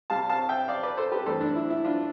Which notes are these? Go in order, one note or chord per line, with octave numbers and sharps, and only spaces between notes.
C2 C3 G3 F5 A5
F5 A5
E5 G5
D5 F5
B4 D5
A4 C5
G4 B4
A1 G2 E3 A4 C5
D4
E4
E4
D4 F4